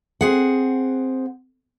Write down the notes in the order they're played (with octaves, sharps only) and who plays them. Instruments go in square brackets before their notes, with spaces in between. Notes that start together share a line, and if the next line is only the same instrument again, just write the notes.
[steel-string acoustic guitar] C4 G#4 F#5